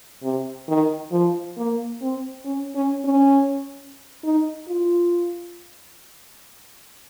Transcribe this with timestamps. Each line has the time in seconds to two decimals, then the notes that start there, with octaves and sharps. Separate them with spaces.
0.23 C3
0.68 D#3
1.12 F3
1.57 A#3
2.02 C4
2.45 C#4
2.75 C#4
3.05 C#4
4.24 D#4
4.68 F4